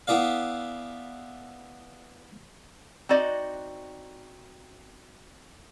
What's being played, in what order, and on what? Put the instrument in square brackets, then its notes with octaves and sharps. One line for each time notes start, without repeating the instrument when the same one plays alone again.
[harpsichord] B3 E4 G#4 D5 F5
[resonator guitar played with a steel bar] C4 D#4 F#4 D5 D#5